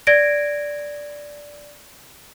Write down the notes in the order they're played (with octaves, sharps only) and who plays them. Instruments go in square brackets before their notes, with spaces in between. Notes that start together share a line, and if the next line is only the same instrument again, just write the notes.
[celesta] D5 G#6 A#6 D7